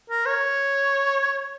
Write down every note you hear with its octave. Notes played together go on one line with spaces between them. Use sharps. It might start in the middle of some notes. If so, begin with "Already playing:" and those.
A#4
C#5